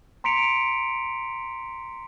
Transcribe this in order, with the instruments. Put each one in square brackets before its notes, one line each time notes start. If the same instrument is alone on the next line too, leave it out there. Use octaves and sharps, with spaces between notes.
[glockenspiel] A#5 C6 B6 C#7 D7 F7